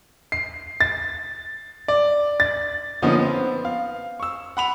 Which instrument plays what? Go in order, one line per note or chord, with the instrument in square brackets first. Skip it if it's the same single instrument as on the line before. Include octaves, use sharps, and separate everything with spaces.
[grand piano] C7
A6
D5
A6
D3 F3 A#3 B3 C#4 D#4
B3 C4
F5
C#6 E6
F#5 B5 F7